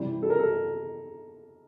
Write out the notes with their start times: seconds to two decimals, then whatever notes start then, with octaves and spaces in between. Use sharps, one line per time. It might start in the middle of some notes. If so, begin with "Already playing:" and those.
Already playing: C3 E3 G3
0.22 A4
0.30 A#4
0.39 A4